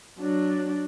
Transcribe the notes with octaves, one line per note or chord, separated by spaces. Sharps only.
F#3 D4